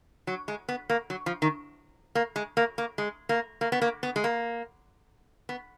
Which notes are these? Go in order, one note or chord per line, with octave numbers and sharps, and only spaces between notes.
F#3
G#3
B3
A#3
F#3
F3
D#3
A#3
G#3
A#3
A#3
G#3
A#3
A#3
B3
A#3
B3
G#3
A#3
B3